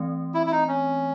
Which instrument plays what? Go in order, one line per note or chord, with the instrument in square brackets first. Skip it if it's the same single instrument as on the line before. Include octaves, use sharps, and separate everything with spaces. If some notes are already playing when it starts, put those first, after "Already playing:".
Already playing: [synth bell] E3 A3 C4
[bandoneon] E4
E4
D#4
C#4